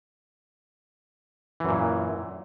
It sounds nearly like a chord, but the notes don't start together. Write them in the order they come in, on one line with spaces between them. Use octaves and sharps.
E3 F#2 A#2